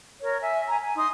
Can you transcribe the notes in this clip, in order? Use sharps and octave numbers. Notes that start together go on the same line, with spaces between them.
A#4 C#5
E5 G#5
G#5 A#5
G#5
D#4 C6 D#6